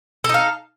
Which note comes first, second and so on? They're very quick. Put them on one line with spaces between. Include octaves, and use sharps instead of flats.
A4 D#4 F5